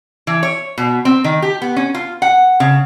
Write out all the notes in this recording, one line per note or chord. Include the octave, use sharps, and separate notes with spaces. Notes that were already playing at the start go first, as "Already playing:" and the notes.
E3
C#5
B2
C4
D#3
G4
B3
C#4
F4
F#5
C#3